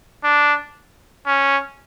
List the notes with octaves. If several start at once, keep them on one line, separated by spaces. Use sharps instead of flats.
D4
C#4